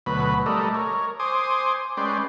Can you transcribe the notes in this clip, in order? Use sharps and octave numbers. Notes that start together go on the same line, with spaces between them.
D2 B2 F#3 B4 B5
G3 A3 A4 A#4 D5 D#5
A#4 C#5
C5 G#5 C6 D6 D#6
G#3 C#4 B4 D5 G5 C6